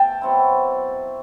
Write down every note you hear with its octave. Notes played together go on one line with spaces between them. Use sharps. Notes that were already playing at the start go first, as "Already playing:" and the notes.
Already playing: B2 A3 G5 A5
B2 F#3 C4 E4